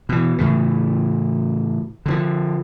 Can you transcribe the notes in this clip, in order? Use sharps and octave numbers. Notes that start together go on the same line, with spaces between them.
B2 E3
A2 C#3 E3
D3 D#3 F3